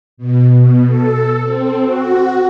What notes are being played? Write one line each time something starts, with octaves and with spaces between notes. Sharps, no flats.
B2
B2
A4
C4
F#4